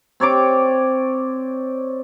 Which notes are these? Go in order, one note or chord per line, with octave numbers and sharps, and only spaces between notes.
C4 C#5 D5 D6